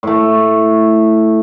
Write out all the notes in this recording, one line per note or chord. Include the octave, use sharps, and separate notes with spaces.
A2 A3